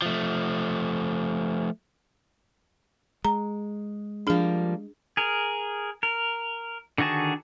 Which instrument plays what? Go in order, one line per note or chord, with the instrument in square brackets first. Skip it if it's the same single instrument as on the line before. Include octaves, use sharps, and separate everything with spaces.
[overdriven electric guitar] F3 A3
[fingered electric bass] G#3 [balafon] A#5
[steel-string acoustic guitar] F3 G3 A#3 [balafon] D4 G#4
[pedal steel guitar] G#4 A#4
A#4
D3 D#3 F#4 G#4 A5